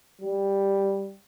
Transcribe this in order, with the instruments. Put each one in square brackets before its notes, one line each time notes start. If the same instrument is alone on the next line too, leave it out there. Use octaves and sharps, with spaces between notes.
[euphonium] G3